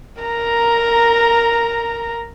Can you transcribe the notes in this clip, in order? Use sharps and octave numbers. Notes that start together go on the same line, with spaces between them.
A#4 A#5